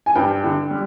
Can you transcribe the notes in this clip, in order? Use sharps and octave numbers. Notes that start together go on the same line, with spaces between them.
G#5
G2 G5
D3
G3